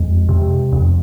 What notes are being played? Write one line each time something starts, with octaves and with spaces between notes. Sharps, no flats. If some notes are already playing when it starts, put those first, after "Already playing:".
Already playing: F2 G#3
C3
F2